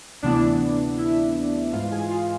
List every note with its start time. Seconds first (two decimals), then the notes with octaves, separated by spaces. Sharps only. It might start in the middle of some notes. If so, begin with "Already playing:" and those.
0.22 D2 C3 E3 B3 D4 E4 D5
0.97 E4 E5
1.72 G#2 E3 G#3 F4 F5
1.92 G#4 G#5
2.10 F4 F5